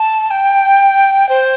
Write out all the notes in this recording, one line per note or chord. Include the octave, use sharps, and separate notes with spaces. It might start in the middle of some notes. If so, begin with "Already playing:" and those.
Already playing: A5
G5
C5